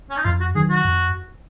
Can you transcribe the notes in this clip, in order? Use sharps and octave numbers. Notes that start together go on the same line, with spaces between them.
C#4
D#4
F2 F4
F#4
D#3 F#3 G#4
F#4
F2